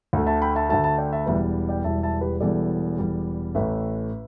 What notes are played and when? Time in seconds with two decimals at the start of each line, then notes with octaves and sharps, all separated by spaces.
0.13 D2 D3 A3
0.27 E5 A5
0.42 G5 B5
0.55 E5 A5
0.69 D2 D3 A3 E5 A5
0.84 E5 A5
0.98 D5 G5
1.13 E5 A5
1.26 E1 E2 E3 G3 B4 E5
1.69 D5 G5
1.84 E1 E2 E3 G3 E5 A5
2.03 E5 A5
2.21 G4 B4
2.40 E1 E2 E3 G3 A4 D5
2.98 E1 E2 E3 G3
3.55 A1 A2 A3 B4 E5